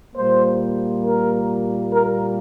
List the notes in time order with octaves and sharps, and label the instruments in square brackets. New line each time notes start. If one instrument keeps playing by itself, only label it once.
[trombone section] A#2 G3 A#3 C5
A#4
A#4